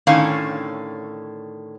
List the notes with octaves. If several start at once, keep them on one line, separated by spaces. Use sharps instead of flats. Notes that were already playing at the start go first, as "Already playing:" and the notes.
A2 D3 D#3 C#4 F5